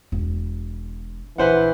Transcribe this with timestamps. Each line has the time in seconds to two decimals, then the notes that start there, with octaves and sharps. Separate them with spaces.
0.12 E1
1.38 A#1 E3 B4 C5 F#5